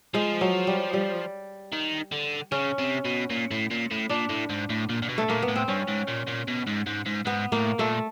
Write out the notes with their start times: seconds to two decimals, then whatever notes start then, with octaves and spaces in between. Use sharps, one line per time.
0.14 F3 G#3
0.41 F#3
0.67 G3
0.93 G3
1.73 D#3
2.12 D3
2.52 C#3 C#4
2.79 C3
3.05 B2
3.30 A#2
3.51 A2
3.71 A#2
3.91 A2
4.09 A#2 D4
4.29 A2
4.50 G#2
4.70 A2
4.89 A#2
5.02 A#2
5.09 B2
5.18 A3
5.29 A#2 A#3
5.43 B3
5.48 A2
5.56 C4
5.68 G2 C#4
5.88 G#2
6.07 A#2
6.27 A#2
6.48 B2
6.67 G#2
6.87 G#2
7.06 G#2
7.26 G#2 B3
7.52 A2 A#3
7.79 A#2 A3